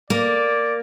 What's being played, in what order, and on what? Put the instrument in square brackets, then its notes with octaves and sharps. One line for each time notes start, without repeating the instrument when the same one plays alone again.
[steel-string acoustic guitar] A#3 [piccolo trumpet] D5